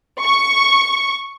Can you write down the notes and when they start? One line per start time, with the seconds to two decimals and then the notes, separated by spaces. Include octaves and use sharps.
0.22 C#6